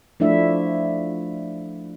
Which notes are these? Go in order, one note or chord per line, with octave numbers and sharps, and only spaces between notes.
F3 A3 D4 E4 E5